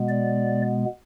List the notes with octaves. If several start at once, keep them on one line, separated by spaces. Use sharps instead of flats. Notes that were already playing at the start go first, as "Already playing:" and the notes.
Already playing: B2 G#3 B3
D5